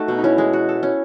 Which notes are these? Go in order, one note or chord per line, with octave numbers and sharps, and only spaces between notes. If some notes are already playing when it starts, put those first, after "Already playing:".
Already playing: A3 D#4 F#4
B2
D#4
C#4 E4
G#3
F#4
A4
C#4